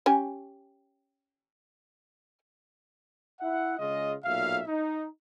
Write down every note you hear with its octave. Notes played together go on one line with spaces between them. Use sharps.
C#4 G4 G#5
E4 E5 F#5
C#3 G#3 F4 D#5
B1 A#2 E5 F5
D#4